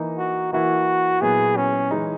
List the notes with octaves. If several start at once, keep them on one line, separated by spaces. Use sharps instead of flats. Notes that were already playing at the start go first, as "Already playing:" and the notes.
Already playing: E3 A#3 D#4
F#4
E3 A#3 E4 F#4
A#2 F#3 B3 E4 G#4
C#4
E3 G#3 D#4